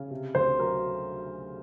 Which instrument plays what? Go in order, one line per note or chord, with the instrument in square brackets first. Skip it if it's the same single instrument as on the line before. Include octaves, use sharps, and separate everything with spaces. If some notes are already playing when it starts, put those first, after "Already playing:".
Already playing: [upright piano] C#3
C3
[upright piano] D2 [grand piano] C5
[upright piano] F#3 [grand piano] A#4